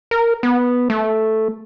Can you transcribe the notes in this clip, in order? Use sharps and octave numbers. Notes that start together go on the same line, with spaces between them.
A#4
B3
A3